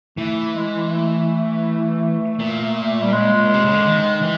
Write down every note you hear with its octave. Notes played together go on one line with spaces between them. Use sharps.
E3 A3
G#3
A3
A#2
G3
G#3
C3
C#3
D3
D#3
E3